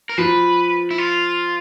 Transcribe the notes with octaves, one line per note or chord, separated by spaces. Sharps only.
A#4
F3 B4
E4
F4